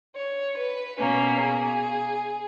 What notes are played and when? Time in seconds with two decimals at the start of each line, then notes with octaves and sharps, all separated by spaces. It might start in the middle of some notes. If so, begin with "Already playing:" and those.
0.15 C#5
0.57 B4
0.99 B2 A#3 C#4
1.40 G#4